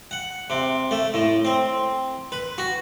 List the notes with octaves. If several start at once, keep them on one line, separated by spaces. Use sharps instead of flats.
F#5
C3
A3
A2
C4
B4
F#4